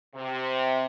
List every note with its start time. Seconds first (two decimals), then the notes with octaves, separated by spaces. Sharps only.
0.15 C3